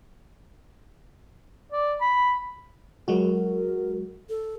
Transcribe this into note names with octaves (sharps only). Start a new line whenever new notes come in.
D5
B5
F#3 G#3 F#4 A#4
A4